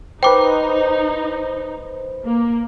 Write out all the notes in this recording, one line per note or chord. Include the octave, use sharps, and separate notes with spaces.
D#4 B4 C5 G5 D6
A#3